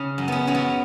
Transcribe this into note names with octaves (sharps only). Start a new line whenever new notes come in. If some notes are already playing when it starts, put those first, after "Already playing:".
Already playing: C#3 C#4
F#2
B3 C#4
F#3 C#4
B3